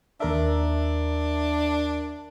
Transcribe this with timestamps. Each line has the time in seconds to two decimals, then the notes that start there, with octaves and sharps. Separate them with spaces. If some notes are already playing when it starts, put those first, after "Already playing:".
0.20 D#2 D4 A#4 E5